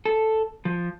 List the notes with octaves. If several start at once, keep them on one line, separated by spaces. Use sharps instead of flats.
A4
F3